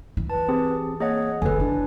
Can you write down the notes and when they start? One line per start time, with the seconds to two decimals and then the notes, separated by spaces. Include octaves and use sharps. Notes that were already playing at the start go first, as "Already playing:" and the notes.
0.17 E3
0.30 B4 A5
0.49 C4 G4 G#4
1.00 A#3 G#4 C#5 D#5 F#5
1.42 F#1 D3 G#3 A4 B4 G#5
1.60 D4 E4